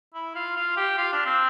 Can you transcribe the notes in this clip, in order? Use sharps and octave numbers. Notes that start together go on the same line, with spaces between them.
E4
F4
F4
G4
F4
D4
C4